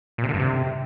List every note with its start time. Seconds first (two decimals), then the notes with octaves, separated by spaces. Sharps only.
0.18 A#2
0.23 C3
0.29 D3
0.34 G2
0.39 C3